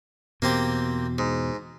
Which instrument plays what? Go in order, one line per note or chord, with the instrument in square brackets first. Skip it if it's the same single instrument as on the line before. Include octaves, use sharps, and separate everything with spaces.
[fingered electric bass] E2 B2 [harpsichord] A#3 C4 G4
[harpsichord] G#2